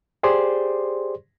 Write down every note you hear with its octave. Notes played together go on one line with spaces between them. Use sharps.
G4 G#4 C5 D5 C6